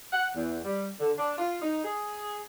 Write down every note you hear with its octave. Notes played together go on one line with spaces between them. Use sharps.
F#5
E2
G3
D3
D4
F4
D#4
G#4